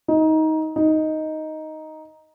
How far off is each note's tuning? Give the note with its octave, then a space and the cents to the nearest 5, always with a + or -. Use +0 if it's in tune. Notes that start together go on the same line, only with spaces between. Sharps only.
D#4 +20
D#4 +5